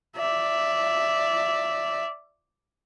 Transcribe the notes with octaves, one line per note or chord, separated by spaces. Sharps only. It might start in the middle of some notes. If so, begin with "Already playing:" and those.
D5 E5